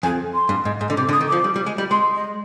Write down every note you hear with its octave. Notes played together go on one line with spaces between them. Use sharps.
F2 G#5
C6
G2
G#2
G#2
D3
C3 D6
D3
D#6
D#3
F3 D6
G3
G3
G#3
G3
G#3 C6
D#5